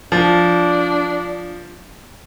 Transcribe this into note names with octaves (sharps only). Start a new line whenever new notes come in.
F3 D4